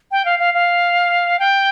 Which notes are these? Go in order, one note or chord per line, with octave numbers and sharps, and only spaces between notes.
G5
F5
F5
F5
G5